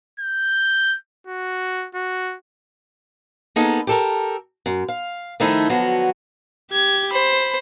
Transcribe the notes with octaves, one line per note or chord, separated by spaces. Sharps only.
G6
F#4
F#4
A#3 B3 D#4 G#4 A4
G4 A4 A#4
F#2
F5
D#3 F3 A3 D#4 E4 A4
D3 F3 F#3 B3 F#4
G4 G#6
C5 B5